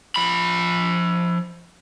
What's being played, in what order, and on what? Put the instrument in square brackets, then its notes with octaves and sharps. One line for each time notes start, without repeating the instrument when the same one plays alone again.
[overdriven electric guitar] F3 B5